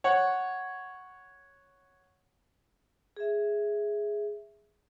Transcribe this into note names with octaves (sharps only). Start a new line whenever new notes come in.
C#5 F#5
G#4 E5